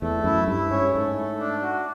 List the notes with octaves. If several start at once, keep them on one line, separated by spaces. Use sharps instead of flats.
E2 A3
F#2 E4
G2 E4
G#2 C#4
G2
G#2 A3
A3
D4
F#4